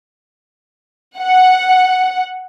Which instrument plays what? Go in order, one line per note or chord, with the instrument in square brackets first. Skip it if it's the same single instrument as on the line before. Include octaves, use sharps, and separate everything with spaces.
[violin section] F#5